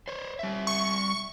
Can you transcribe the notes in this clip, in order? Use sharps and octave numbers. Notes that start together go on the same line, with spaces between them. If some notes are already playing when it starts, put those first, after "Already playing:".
C5 C#5
G3 E5
C#6